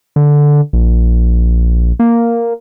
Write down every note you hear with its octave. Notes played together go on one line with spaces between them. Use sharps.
D3
A#1
A#3